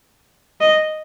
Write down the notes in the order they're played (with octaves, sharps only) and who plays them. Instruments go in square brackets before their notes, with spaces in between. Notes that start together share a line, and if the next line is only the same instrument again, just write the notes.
[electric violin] D#5